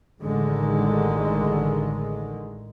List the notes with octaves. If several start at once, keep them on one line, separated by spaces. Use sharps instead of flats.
A1 A2 D3 D#3 G#3